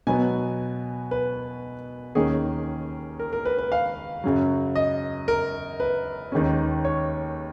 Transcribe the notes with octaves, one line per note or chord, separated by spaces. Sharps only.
B2 F#3 B3 G#5
B4
D#2 D#3 A#3 C#4 G#4
A#4
A#4
B4
B4
F5
F#2 C#3 F#3
D#5
A#4
B4
D#2 D#3 G#3 C#4
C#5